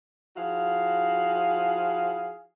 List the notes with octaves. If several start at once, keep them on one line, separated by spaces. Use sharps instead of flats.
F3 E4 F#4 G#4 F5